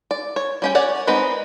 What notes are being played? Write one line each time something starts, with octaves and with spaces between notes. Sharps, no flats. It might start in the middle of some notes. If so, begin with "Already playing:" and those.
D5
C#5
G3 C#4 G5
C#5 D5 F#5 G#5
G#3 B3 C4 D#4 B4